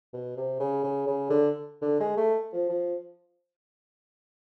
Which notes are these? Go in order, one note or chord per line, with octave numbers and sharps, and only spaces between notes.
B2
C3
C#3
C#3
C#3
D3
D3
G#3
A3
F3
F3